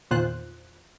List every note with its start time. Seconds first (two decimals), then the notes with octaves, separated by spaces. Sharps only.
0.11 E2 A#2 D#3 F4 C5 F#6